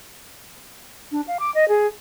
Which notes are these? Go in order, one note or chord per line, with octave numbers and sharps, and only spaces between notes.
D4
F5
D6
D#5
G#4